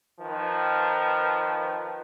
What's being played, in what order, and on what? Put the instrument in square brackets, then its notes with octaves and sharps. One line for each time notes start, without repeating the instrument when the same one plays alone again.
[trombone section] D#3 F3 B4